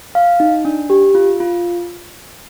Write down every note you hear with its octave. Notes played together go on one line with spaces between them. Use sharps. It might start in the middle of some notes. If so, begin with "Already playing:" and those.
F5
D#4
D4
G4
F4
F4